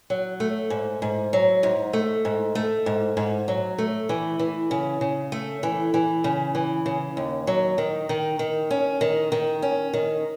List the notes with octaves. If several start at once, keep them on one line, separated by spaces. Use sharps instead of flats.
F#3
A3
G#2
G#2
F#3
G#2
A3
G#2
A3
G#2
G#2
F#3
A3
E3
E3
C#3
C#3
A3
E3
E3
C#3
E3
C#3
D#2
F#3
D#3
D#3
D#3
C#4
D#3
D#3
C#4
D#3